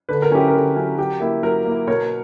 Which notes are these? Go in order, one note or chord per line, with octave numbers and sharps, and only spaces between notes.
D3 B4
A#4
F#3 C#4 E4 G4
A#4
D3
F#3 C#4 E4
F#3 G4
A#3 E4
F#3 A#4
A#3 E4
B2 A#4 C#5